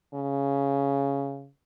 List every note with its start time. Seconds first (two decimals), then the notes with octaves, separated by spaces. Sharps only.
0.14 C#3